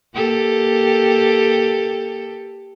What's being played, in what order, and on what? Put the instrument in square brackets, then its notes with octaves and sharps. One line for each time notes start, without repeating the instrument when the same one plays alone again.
[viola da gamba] A#3 G4 A4